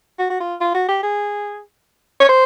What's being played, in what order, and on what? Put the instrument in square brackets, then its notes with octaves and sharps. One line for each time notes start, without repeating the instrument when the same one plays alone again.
[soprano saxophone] F#4
F#4
F4
F4
F#4
G4
G#4
C#5
C5